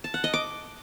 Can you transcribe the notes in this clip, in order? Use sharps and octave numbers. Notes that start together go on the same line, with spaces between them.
A5
F#5
D#5
D6